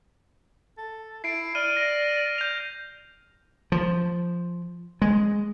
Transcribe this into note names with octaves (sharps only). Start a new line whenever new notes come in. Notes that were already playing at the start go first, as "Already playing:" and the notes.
A4
E4 C7 D7
D5 F6 D#7
A#6
G6 F7
F3
G#3